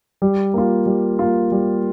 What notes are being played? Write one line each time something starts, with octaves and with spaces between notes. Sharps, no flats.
G3
A#3 F4
G3
A#3 F4
G3